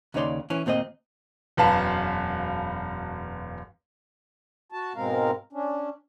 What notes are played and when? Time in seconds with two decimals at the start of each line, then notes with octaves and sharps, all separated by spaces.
0.14 D#2 C#3 D#4 C#5 D5 C6
0.50 E3 C#4
0.66 D#2 A#2 C4 G4 D#5
1.57 E1 F#2 B4 F5 A5
4.72 F#4 A5
4.95 G#2 B2 G#3 C4 A#4 F5
5.53 C#4 D4